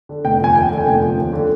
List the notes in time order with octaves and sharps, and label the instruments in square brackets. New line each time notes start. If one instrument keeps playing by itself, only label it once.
[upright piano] D3
F1 G5
F3 G#5
D#2 G5
D3
G#5
F1 G5
F3
D#2
D3